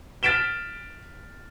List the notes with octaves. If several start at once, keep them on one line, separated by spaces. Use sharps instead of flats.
F6 A6 B6 D7 E7 G7